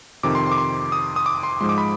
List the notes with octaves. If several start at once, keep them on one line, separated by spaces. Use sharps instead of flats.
F2 C3 D#3 D6
C6
C6
D6
C6
D#6
D#6
D6
C6
G#2 F3 G#3 C6
D6
B5